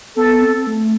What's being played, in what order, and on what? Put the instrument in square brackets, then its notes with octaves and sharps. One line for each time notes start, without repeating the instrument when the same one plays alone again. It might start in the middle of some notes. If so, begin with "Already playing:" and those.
[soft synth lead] B3 [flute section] A4
[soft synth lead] C4
A3